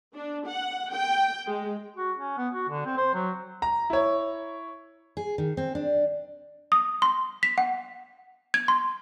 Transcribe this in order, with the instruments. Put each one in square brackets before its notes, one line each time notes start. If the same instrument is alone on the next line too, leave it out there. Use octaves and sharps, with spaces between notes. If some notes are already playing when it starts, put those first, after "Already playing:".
[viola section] D4
F#5
G5
G#3
[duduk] F#4
C#4
B3
F#4
D3
C4
C5
F#3
[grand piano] A#5
E4 C#5
[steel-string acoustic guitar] G#4
D#3
C4
D4
[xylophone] D#6
C6
B6
F#5
G#6
C6